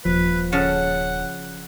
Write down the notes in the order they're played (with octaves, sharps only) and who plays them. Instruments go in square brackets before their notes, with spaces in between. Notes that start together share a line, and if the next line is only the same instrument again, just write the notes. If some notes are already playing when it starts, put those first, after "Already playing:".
[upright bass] D#1 [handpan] F3 [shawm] B4
[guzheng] C#3 C#4 A5 [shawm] F#5